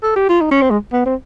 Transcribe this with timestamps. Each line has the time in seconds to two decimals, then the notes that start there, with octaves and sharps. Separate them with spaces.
0.03 A4
0.16 G4
0.29 F4
0.41 D#4
0.51 C#4
0.62 C4
0.70 G#3
0.93 B3
1.06 C4